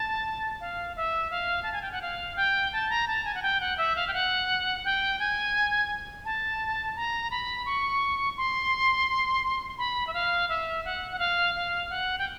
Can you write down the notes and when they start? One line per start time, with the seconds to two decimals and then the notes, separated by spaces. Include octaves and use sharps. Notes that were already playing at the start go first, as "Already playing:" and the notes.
Already playing: A5
0.60 F5
0.96 E5
1.31 F5
1.63 A5
1.73 G#5
1.82 G5
1.92 F#5
2.02 F5
2.36 G5
2.73 A5
2.90 A#5
3.07 A5
3.25 G#5
3.35 F#5
3.42 G5
3.60 F#5
3.78 E5
3.96 F5
4.08 G5
4.13 F#5
4.85 G5
5.19 G#5
6.25 A5
6.96 A#5
7.31 B5
7.66 C#6
8.37 C6
9.78 B5
10.07 E5
10.14 F5
10.49 E5
10.85 F#5
11.12 F#5
11.19 F5
11.55 F5
11.90 F#5
12.18 G5